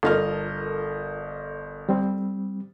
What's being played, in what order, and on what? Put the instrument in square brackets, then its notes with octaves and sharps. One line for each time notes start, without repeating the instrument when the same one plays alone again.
[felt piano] G1 D#5 F6 [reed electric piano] F4 [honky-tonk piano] A4 A#4
[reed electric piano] G3 C4